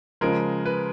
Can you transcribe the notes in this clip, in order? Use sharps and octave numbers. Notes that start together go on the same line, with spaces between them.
C#3 F3 G#3 A#4
B4